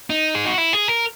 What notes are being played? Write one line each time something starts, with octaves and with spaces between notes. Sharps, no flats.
D#4
G#4
F#4
E4
G#4
A#4